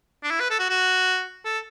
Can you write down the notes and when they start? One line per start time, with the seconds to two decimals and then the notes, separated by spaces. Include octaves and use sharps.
0.23 D4
0.31 E4
0.40 B4
0.51 A4
0.59 F#4
0.70 F#4
1.45 A4